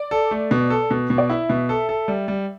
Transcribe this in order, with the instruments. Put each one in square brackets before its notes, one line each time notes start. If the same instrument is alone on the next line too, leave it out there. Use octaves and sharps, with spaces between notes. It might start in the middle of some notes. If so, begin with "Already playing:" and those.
Already playing: [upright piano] D5
[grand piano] A4
A3
B2
A4
B2
B2
[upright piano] D5
[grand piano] E4 [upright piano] E5
[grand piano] B2
A4
A4
G3
G3